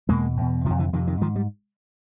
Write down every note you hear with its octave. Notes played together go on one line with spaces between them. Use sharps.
E2 B2 G#3 A#3
E2 B2
C3 D#3 F3
F2
D3 E3
F2 C3 D#3
D#3
G#2 D#3 F3
G3